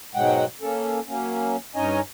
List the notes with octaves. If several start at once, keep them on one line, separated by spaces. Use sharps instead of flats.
G#2 B2 F#3 G#3 F#5 G5
A#3 C#4 A4
F#3 A#3 C#4
G2 C#4 D#4 C#5 D#5 G#5